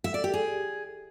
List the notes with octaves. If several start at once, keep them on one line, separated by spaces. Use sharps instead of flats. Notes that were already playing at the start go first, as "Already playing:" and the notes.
E5
D5
G4
G#4